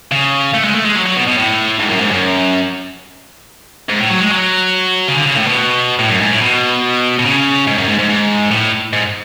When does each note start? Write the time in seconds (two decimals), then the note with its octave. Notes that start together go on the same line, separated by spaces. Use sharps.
0.11 C#3
0.54 A3
0.64 G#3
0.74 A3
0.85 G#3
0.96 F#3
1.06 F#3
1.17 B2
1.27 B2
1.38 A2
1.79 G#2
1.89 F#2
2.01 G#2
2.11 F#2
3.89 G#2
4.00 A2
4.10 F#3
4.21 G#3
4.31 F#3
5.09 C#3
5.15 D3
5.26 C#3
5.37 A2
5.47 B2
5.99 A2
6.10 F#2
6.20 G#2
6.31 A2
6.41 B2
7.19 B2
7.25 C#3
7.67 G#2
7.77 F#2
7.88 G#2
7.98 G#2
8.09 G#2
8.51 A2
8.93 G#2